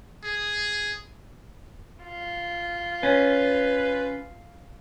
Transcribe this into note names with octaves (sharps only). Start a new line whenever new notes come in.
G#4
F4
C#4 B4